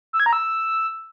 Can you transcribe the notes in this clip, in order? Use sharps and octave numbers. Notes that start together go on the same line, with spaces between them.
E6
G#6
A#5
E6